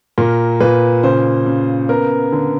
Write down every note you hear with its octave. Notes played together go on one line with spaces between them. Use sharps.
A#2 A#4
A#2 B4
C#3 C5
C#3
B3 A#4
D3